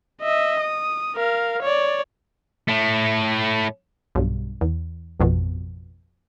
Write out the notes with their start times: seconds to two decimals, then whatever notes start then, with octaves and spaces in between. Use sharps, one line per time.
0.21 D#5 E5
0.61 D#6
1.16 A#4 F5
1.63 C#5 D5
2.69 A2 A3
4.15 B1 G2
4.61 E2
5.20 A1 F2 B2